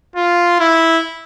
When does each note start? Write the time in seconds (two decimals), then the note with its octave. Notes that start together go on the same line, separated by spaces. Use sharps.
0.16 F4
0.60 E4